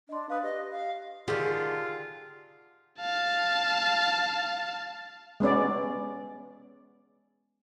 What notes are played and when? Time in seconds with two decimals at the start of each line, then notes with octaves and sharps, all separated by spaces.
0.09 D4 D#5 C6
0.30 B4 F5 D#6
0.43 G4 D#5
0.71 F5
1.28 D3 D#3 F4 G4 G#4
3.00 F5 A5
5.40 G#3 B3 C#4 D5